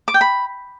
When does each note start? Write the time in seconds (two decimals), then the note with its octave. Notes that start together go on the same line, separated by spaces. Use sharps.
0.08 D6
0.14 G5
0.21 B5